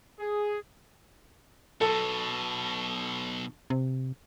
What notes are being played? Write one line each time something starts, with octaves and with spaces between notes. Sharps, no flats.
G#4
B1 B2 A4
C3